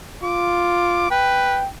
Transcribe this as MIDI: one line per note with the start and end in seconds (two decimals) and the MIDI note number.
0.23 1.09 65
0.23 1.10 86
1.11 1.59 71
1.11 1.69 79